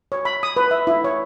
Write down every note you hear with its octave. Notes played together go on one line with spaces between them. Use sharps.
C#5
B5
D#6
B4
E5
E4
C#5